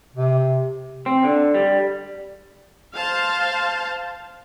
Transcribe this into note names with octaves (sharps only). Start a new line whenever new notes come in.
C3
C4
D3
G3
C5 F5 A5